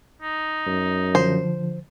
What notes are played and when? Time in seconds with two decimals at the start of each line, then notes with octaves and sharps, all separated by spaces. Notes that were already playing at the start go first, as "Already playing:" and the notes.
0.22 D#4
0.66 F#2
1.15 D3 F3 C5